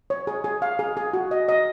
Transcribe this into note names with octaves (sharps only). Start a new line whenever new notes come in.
C#5
G#4
G#4
F5
G#4
G#4
F#4
D#5
D#5